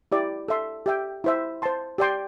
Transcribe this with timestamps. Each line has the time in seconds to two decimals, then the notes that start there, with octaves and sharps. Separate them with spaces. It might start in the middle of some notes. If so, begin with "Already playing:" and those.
0.12 E4 G4 D5
0.48 A4 E5 C6
0.86 G4 E5 G5
1.24 E4 C5 E5
1.62 C5 A5 C6
1.98 G4 D5 G5 C6